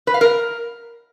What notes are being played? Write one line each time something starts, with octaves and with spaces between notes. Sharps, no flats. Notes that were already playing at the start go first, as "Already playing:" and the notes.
B4
F5
A#4